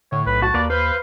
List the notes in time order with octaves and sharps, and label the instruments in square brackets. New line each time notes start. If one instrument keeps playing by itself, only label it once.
[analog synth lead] A2 [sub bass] D3 [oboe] C#5
[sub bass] B1 [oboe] B4
[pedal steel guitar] F#4 [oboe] A5
[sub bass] D#2 [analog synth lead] A#3 [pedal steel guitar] B4 D5
[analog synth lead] B4 [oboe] C5 [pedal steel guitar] F5